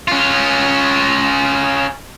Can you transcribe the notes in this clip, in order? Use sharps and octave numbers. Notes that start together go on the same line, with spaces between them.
C#4 F4